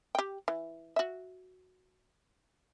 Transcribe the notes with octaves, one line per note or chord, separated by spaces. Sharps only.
G4 G5
E3
F#4 E5